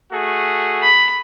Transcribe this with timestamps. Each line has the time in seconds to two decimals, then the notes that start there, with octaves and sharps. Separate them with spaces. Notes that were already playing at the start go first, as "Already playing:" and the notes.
0.13 A3 F#4 G#4
0.82 B5